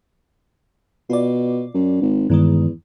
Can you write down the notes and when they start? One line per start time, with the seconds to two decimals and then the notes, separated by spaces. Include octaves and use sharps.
1.10 B2 F4 D5
1.74 F#2
2.02 G#1
2.30 E2 G2 D#3 G#3